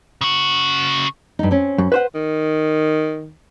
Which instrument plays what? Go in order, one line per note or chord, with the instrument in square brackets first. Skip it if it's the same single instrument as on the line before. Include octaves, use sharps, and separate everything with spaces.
[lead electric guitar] C#3 F#4
[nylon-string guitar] G2 D#4
C4 C#4
[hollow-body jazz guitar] F#2
B4 C5 F#5
[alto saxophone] D#3